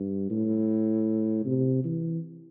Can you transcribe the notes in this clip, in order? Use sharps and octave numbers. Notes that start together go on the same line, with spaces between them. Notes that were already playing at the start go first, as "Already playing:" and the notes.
Already playing: G2
A2
C3
E3